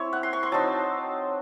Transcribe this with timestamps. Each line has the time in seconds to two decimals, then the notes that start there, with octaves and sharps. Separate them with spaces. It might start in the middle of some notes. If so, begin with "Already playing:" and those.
Already playing: C4 E4 C#5
0.13 F#5
0.23 C6
0.33 C#6
0.43 C6
0.52 F#3 C4 D#4 A5